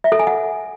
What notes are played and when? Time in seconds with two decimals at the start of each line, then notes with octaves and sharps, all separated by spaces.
0.04 E5
0.12 A4
0.19 G#5
0.27 F#5